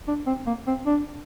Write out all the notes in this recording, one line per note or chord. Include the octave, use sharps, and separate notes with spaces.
D4
C4
A#3
C4
D4